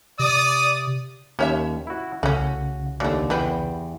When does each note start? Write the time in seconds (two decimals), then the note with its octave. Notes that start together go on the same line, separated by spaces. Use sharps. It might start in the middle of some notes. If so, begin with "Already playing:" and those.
0.19 C3 D5 D#6
1.39 D#2 C#4 C#5 E5
1.87 E4 F#4
2.23 C2 C#3 A3 C#4 F#4
3.00 D#2 F#3 A3 D4 D5
3.30 E2 G3 B3 C4